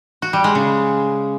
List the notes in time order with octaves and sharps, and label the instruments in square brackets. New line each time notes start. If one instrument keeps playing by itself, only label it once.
[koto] F#4
G3
G#3
C#3